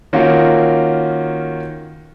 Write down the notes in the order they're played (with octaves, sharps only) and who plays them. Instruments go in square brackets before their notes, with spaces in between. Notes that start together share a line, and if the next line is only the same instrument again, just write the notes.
[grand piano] D#3 A#3 C#4 F4 F#4